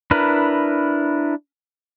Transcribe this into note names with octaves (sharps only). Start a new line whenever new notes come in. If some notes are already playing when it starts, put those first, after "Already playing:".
D4 E4 A#4 B4